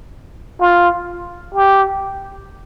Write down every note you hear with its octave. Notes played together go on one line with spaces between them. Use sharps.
F4
G4